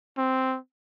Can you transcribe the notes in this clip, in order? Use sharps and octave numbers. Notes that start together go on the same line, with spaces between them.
C4